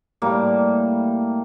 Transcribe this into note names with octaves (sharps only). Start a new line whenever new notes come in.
A2 G3 A#3